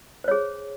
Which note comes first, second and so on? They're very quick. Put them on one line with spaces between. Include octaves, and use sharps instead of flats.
C5 C#5 G#4